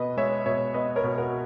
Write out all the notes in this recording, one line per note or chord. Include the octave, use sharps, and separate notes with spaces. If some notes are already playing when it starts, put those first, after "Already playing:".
Already playing: B2 B3 B4 D#5
G#3 C#5 E5
B2 C#5 E5
B3 B4 D#5
A#4 C#5
B2
F#4 A#4